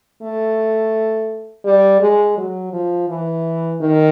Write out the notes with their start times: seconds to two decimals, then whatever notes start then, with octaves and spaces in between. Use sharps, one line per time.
0.22 A3
1.65 G3
2.01 G#3
2.37 F#3
2.73 F3
3.09 E3
3.81 D#3